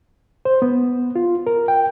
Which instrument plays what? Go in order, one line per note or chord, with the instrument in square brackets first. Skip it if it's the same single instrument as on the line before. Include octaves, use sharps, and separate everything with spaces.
[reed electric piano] C5
B3
F4
A#4
G5